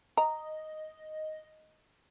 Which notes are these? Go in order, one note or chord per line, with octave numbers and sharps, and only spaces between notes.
D#5 A#5